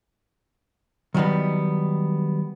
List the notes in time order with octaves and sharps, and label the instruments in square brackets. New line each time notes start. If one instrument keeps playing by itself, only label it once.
[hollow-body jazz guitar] D#3 F#3 G3 B3 D#4